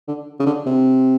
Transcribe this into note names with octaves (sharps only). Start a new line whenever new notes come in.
D3
C#3
D3
C3